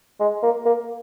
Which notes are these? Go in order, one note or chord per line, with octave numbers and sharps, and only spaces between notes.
G#3
A#3
A#3